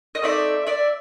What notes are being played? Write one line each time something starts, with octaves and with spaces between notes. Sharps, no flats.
D#5
A3 C4 D#4 D5 E5
D5 E5